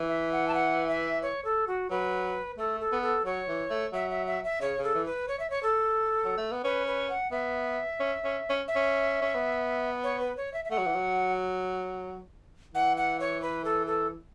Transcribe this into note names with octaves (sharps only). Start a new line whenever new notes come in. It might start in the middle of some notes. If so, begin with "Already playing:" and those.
Already playing: E3
E5
F#5
A5
F#5
E5
C#5
A4
F#4
F#3 B4
A3 A4
A4
B3
A4
F#3 C#5
E3
A3
F#3 E5
E5
E5
E5
C#3 C#5
C#3
A4
E3
B4
C#5
E5
C#5
A4
F#3
A3
B3
C#4 B4
B4
F#5
B3 E5
C#4
C#4
C#4
E5
C#4
C#4
B3
C#5
B4
C#5
E5
E5
A3 F#5
F#3
E3
F#3
E3 F#5
F#5
C#5
B4
A4
A4